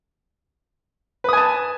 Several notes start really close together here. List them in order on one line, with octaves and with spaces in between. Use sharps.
B4 D#6 G#5 A5